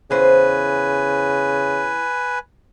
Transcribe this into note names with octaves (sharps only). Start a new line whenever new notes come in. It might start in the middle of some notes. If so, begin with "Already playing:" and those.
E2 C#3 B4 C5 G#5